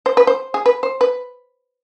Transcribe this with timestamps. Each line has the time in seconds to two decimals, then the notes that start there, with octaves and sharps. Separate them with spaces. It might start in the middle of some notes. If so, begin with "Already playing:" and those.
0.06 C5
0.17 B4
0.27 C5
0.54 G#4
0.66 B4
0.83 C5
1.01 B4